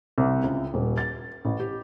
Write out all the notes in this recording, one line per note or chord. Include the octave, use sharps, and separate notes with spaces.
C2
C#2
D#1
A6
A1
G4